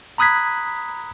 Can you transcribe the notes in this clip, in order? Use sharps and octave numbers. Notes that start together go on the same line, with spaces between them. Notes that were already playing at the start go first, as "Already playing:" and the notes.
A#5 B5 D#6 F#6 G#6 B6